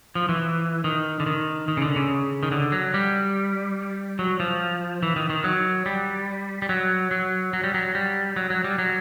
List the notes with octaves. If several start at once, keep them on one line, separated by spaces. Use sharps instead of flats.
F3
E3
D#3
D3
D#3
D#3
C#3
D3
C#3
D#3
D3
F#3
G3
F#3
F3
E3
D#3
D#3
F#3
G3
G3
F#3
F#3
F#3
G3
F#3
G3
F#3
F#3
G3
F#3